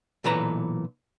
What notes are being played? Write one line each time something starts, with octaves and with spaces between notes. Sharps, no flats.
B1 A#2 E3 A4 B4 A#5